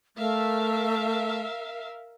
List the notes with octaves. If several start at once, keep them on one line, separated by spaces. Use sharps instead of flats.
A3 A#4 E5 F5